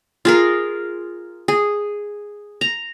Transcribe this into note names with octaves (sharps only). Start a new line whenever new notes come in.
F4 G#4 A#4
G#4
A#5